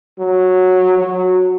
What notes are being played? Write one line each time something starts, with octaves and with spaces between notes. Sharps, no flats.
F#3
F#3